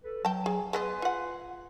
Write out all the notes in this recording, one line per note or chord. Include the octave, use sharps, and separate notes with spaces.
A4 B4
F#3 G5 A5
G#4 G#5
G#3 B3 B4 D#5 G#5 C6
F4 F#5